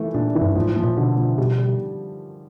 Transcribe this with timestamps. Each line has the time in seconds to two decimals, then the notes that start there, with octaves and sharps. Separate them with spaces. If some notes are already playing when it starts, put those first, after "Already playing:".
Already playing: E3 A3
0.14 A#2 D4
0.35 E3
0.42 G2
0.56 G#2 F3
0.69 A2
0.76 F3
0.84 A#2
0.97 B2 D3
1.17 F3
1.38 B2 G3
1.58 G3